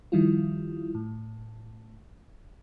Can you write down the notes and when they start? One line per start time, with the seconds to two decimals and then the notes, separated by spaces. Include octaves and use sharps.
0.12 D#3 F3 G3 E4 F4
0.95 A2